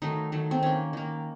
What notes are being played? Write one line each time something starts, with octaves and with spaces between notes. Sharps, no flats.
D#3 F#3 A3 D#4
D#3 F#3 A3
C4
D#3 A#3 C#4
D#3 A#3